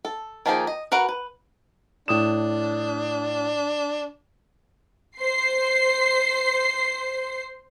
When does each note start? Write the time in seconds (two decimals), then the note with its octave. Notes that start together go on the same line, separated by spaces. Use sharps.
0.05 A4
0.46 D#3 F3 A#3 D#4 G#4
0.67 D#5
0.92 F#4 A#4 B4 F#5
1.09 B4
2.08 A2 D4 D#6 E7
5.17 C5 C7